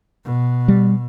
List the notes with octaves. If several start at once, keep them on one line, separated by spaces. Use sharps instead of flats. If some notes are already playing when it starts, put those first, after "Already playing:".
B2
G3